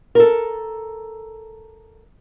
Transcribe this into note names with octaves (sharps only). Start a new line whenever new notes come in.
A4 A#4